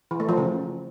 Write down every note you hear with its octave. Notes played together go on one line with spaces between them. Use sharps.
E3
A3
F3
C#3